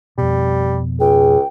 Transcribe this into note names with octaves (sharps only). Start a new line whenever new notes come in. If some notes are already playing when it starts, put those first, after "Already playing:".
F2 B2 G3
C#2 G#4 G5